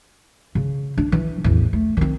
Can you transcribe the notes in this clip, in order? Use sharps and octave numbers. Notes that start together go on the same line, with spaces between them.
C#3
D4
E3
A1 E2
A3
D#3 C4